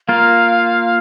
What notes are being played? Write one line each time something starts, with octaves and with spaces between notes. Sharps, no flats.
A#3 F4 A#4 F5